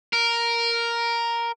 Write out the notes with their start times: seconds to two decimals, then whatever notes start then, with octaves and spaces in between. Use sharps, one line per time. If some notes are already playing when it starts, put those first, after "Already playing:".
0.13 A#4